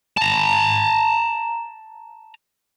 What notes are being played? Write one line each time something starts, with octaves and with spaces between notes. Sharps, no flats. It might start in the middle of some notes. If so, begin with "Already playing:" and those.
A5 A#5